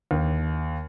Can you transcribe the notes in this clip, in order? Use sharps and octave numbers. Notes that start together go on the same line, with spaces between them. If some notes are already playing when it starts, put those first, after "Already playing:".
D#2